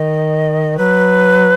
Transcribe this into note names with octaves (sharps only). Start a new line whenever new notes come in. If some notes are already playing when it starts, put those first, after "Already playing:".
Already playing: D#3 D#5
F#3 B4